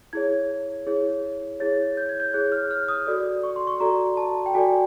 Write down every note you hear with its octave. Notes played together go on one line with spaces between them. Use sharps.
E4 G#4 C#5 G#6
E4 G#4 C#5
E4 G#4 C#5 A6
G6
G#6
G6
E4 G#4 C#5 F#6
F6
F6
D#6
F#4 A4 D5
C#6
C6
C#6
F#4 A4 D5 A#5
A5
G5
F#4 A4 D5 G#5